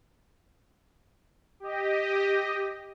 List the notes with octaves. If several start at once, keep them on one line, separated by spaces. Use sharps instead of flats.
G4 D#5